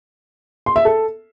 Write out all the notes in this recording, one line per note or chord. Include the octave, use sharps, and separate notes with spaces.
C6
E5
A4